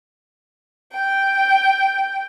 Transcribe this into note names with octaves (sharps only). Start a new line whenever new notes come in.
G5